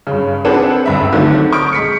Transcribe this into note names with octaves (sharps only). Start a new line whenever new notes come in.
G2 C#3
C4 D4 G#4 A4 B4 F#5
C#2 G2 E5
D3 D#3 F#3 A3 C4 D4
C#6 D#6 F6 G6 D7
G#3 B6 C#7